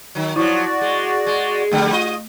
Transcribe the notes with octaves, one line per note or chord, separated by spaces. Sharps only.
D#3 F#3
F3 F#3 E4 F#4 D5 C#6
G#3
G#3
F2 D3 G3 A3 G5 F#6
F4 D#5